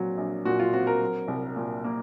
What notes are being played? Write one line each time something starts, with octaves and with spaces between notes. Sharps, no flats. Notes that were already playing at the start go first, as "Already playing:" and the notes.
Already playing: A#2 F#3 C4
A#1
A#2 F#4
F4
C4 F#4
A#4
F#3
C2
A#2
A#3